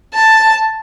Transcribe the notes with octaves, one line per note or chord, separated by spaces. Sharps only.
A5